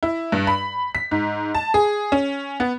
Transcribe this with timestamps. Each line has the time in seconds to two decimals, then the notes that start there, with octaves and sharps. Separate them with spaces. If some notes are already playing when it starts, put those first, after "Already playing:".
0.03 E4
0.32 G2
0.47 B5
0.95 B6
1.11 G#2
1.55 A5
1.74 G#4
2.12 C#4
2.60 B3